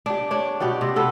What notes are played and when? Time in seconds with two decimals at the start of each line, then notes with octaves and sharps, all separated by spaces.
0.06 D4 G4
0.31 D4 C#5
0.60 B2 G4 D5 F#5
0.81 C3
0.96 B3 A4 F#5